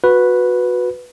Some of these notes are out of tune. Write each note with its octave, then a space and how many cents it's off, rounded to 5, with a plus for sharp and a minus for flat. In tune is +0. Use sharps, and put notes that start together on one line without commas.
F#4 -20 B4 +0